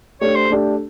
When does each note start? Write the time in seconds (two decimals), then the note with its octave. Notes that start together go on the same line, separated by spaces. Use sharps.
0.21 A3 D4 G4 C#5
0.35 C5
0.50 A3 D4 G4